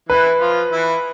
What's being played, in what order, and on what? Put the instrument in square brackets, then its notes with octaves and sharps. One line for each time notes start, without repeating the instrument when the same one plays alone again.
[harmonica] E3 E4 [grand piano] B4
[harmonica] F3 F4
E3 E4